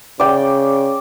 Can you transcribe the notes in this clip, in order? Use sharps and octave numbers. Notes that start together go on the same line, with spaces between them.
C#3 D5 G5